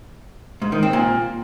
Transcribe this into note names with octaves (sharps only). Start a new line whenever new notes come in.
G#2
D#3
C4
A#2